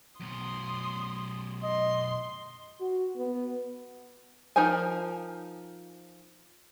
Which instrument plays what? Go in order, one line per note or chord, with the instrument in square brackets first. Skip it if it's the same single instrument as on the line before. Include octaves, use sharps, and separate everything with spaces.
[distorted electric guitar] F#2 B2 [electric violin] C6 D#6
[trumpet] D#5 [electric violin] C6
[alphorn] F#4
B3
[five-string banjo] F3 D#4 A#4 C5 G#5